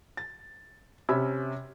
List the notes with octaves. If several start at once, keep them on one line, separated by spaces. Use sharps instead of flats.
A6
C3 C#4 B5 E6 G#6